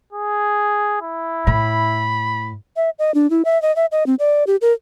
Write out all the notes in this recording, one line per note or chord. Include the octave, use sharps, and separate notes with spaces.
G#4
E4
A2 B5
E5
D#5
D4
E4
E5
D#5
E5
D#5
C4
D5
G4
A#4